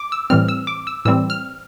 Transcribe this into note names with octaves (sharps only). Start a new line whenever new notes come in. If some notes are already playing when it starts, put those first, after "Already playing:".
Already playing: D6
E6
A2 E3 G3 C4 F6
E6
D6
E6
A2 E3 G3 C4 E6
F6